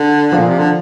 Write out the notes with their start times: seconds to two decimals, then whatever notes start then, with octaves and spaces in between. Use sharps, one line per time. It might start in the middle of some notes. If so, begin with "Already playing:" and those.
Already playing: D3
0.32 F3 A#3 F4 A#4 D5
0.38 A#2
0.48 C3
0.59 D3